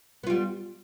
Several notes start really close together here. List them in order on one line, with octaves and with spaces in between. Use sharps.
B3 F4 G3